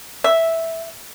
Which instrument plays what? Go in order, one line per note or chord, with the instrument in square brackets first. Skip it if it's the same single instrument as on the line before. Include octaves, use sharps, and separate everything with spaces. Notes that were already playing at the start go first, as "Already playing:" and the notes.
[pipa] E5